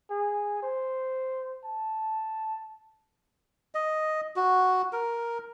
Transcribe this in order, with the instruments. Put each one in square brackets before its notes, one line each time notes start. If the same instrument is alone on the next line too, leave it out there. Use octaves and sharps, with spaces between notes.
[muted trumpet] G#4
C5
A5
[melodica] D#5
F#4
A#4